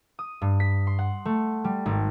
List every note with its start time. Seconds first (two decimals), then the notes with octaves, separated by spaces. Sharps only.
0.19 D#6
0.42 G2
0.60 B6
0.87 C6
0.99 F#5
1.25 A3
1.64 G3
1.86 G#1